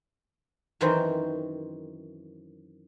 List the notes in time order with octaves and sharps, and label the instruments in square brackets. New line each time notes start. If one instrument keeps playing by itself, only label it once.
[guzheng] F#2 D#3 E3 C4 F#4 C5